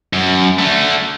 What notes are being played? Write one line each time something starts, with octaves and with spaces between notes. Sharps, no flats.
F#2
D3 A3